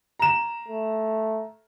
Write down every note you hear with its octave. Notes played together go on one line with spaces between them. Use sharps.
A#5 E7
A3